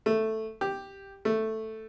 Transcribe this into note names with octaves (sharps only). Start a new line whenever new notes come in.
A3
G4
A3